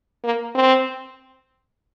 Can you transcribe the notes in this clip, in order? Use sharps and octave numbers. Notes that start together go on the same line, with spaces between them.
A#3
C4